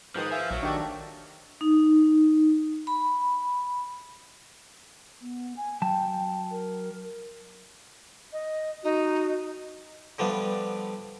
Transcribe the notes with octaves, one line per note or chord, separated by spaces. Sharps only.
G#2 D#3 F3 B4 D#6
E5 F5 G#5
A#1 F#3
D#3 A3 D4 G4 D5
D#4
B5
B3
G#5
F#3 G5 A5
A#4
D#5
D#4 F#4
D3 F3 G3 A3 B3 D4